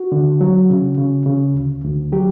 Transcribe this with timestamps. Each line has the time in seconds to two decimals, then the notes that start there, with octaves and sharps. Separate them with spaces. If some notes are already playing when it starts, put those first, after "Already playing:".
Already playing: F#4
0.12 D3
0.41 F#3
0.70 C#3
0.98 C#3
1.26 C#3
1.55 D2
1.84 D2
2.12 F#3 G4